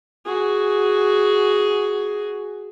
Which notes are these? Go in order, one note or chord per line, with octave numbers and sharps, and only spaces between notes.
F#4 G#4